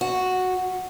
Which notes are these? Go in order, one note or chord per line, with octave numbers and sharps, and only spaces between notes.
F#4